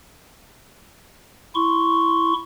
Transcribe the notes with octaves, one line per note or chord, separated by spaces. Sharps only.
E4 C6 C#6